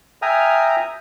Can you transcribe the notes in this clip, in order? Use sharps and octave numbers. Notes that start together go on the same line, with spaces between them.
E5 G5 G#5 A#5 D#6 F6